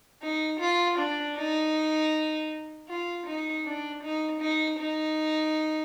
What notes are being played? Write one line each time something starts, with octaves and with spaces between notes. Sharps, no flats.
D#4
F4
D4
D#4
F4
D#4
D4
D#4
D#4
D#4